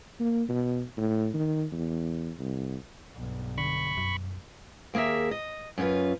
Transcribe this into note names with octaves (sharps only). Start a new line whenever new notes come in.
A#3
B2
A2
D#3
E2
C2
B1 G2
D3 B5 C#6
F#2
D#2 A#3 G#4 A#4 E5
D#5
F#2 C#4 D#4 F4 B4